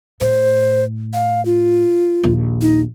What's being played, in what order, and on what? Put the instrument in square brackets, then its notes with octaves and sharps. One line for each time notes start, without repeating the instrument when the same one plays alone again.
[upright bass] A2 [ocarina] C5
[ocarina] F5
F4
[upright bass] A#1 D#2
[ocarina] D#4